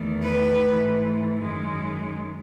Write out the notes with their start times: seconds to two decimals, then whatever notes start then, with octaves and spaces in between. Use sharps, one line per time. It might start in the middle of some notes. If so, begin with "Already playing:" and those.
Already playing: E2 D#3 A3
0.22 B4
0.62 G#2 E3 A3
1.40 F#2 D#3 G#3